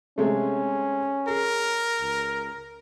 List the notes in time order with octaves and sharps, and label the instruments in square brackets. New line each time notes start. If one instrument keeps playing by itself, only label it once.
[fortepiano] C3 G#3 A3 [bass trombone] C#4
[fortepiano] G#4 [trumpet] A#4
[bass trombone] C#2